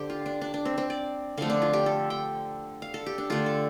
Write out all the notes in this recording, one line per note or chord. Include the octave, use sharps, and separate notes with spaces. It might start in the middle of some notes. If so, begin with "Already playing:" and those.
Already playing: D3 G4 C5
F4
D4
D4
D4
C4
C4
D5
D3 F3 A3 F5
D4
F4
G4
A4
G5
F5
A4
G4
D4
D3 A3 F4
A4